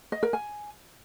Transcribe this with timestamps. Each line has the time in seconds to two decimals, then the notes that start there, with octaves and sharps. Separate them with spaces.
0.12 D#5
0.23 A#4
0.33 G#5